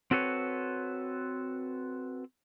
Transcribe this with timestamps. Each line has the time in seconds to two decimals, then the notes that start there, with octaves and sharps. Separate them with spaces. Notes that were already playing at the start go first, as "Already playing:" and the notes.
0.11 C4 F#4 A4 B4 C#5